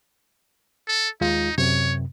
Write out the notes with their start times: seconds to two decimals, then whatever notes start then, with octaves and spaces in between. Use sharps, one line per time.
0.88 A4
1.21 D#2 G#3 D#4 F4
1.58 F#2 C3 C#5